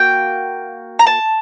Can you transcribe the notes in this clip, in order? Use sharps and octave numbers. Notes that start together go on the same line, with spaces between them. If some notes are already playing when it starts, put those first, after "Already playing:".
Already playing: A#3 F#4 G5
A#5
A5